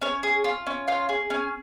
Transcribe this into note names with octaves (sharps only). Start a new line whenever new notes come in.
C#4 C#5
G#4
F4
C#4
F4 F5
G#4
C#4 G#5